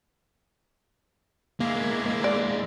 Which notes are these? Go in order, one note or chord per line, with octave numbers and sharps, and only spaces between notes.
G#3 A#3 E4
D5